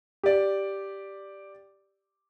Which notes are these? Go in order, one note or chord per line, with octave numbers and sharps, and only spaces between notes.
G4 D5